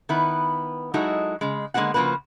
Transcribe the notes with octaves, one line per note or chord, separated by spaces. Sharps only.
D#3 B3 E4 B4
F#3 G#3 D#4 E4 F#4 A4
C#3 G#3
D3 G#3 A#3 B3 F#4 F#5
C#3 F3 F#3 A#3 F#4 B4